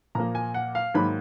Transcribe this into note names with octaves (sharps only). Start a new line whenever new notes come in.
A#2 F3 A#3 A#5
G#5
F#5
F5
G#2 D#3 F#3 A#3 B5